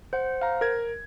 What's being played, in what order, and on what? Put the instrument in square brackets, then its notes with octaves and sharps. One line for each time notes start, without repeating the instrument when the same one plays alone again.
[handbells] C5 F#5
[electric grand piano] F5 A#5
A#4 G#6